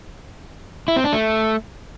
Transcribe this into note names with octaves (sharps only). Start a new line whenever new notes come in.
E4
C4
D4
A3